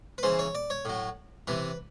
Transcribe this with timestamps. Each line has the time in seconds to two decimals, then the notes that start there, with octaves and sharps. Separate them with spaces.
0.18 B4
0.23 C#3 E3 C5
0.39 C#5
0.55 D5
0.70 C#5
0.85 A2 F#3
1.47 C3 E3 B4